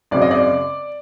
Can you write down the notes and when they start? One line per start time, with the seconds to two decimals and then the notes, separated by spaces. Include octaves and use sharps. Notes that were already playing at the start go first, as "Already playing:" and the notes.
0.11 G#1 F#2 C#3 D5
0.22 D#5
0.31 D5